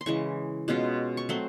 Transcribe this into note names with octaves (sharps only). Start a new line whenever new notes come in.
C6
C#3 E3 G#3 C#6
B2 G#3 C#4 F4
C#6
F#3 A3 C4 C6